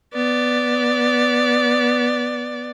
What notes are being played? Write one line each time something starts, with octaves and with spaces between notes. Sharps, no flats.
B3 D5